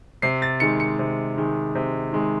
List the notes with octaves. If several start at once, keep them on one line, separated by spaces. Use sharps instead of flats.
C3 C7
A6
D#3 G#3 C#7
C#7
C3
D#3 G#3
C3
D#3 G#3